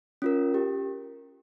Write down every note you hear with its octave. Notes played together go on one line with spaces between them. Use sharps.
C#4 F4 A#4
G4